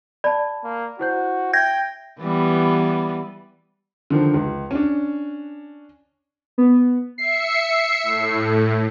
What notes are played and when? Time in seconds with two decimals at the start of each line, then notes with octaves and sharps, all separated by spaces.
0.24 D5 A5 B5
0.64 A#3
0.99 E4 F#4 C5 G6
1.53 E5 G5 G6 G#6 A#6
2.20 E3 G3 B3
4.10 D3 D#3 F3
4.34 C#2
4.71 C#4 D4
6.58 B3
7.18 E5 C7 C#7
8.03 A2